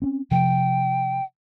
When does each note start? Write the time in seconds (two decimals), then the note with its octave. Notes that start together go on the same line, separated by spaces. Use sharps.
0.02 C4 C#4
0.31 C3 F3 G5